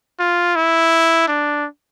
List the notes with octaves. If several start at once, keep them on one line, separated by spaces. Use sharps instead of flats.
F4
E4
D4